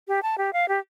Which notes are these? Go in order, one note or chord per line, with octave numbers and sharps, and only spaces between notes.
G4
A5
G4
F5
G4